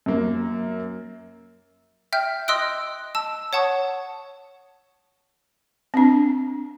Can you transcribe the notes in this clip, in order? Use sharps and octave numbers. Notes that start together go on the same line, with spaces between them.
F#2 A#3
E5 G5 F6 G6
D#5 C6 D#6 E6 F#6 D7
A5 E6
C#5 F#5 A5 C#6 D#6
C4 D4